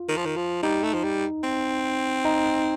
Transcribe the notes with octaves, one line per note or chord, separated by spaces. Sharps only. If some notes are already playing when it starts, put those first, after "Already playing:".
Already playing: F4
D#3
F3
D#3
F3
G3 D#4
A3
F3
G3
C4
D#4